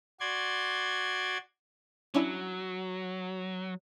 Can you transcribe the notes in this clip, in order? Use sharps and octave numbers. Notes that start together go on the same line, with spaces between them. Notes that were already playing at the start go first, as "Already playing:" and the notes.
F#4 D5 C6 G#6
F#3 C#4 D4 E4